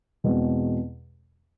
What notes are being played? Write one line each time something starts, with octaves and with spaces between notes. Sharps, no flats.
E2 B2 G#3 C4